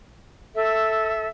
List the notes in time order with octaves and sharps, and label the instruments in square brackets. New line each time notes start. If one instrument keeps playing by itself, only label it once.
[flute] A4 [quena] E5